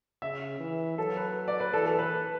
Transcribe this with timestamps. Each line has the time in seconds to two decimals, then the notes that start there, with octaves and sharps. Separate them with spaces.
0.22 C#3 E5
0.60 E3
0.98 F#3 A4
1.17 B4
1.48 D5
1.60 B4
1.73 E3 A4
1.86 A4
1.99 B4